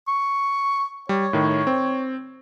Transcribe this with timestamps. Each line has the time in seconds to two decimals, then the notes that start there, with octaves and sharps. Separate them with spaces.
0.08 C#6
1.09 G3 C#5
1.33 A2 D#3
1.67 C4